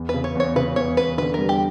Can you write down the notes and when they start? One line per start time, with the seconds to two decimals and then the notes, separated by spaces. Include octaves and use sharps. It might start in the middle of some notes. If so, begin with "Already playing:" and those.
Already playing: E2
0.09 B4
0.14 C#3
0.24 C#5
0.35 E2 C#5
0.56 C#3 B4
0.76 E2 C#5
0.97 E2 B4
1.18 D3 B4
1.34 G3 A#4
1.49 G4